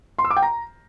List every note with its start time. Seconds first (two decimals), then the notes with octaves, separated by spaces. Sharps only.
0.19 C6
0.24 E6
0.30 D6
0.36 G5
0.42 A#5